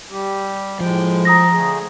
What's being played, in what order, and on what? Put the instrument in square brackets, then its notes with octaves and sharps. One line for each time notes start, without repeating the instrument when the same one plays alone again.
[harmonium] G3 G4
[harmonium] A2 G#3 G5 [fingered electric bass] F3
[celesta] A#5 D#6 A#6
[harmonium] D3 A3 G#4